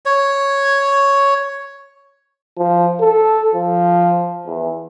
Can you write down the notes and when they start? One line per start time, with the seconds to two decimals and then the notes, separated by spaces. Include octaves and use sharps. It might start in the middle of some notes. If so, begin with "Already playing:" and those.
0.06 C#5
2.58 F3
3.01 A4
3.55 F3
4.47 E2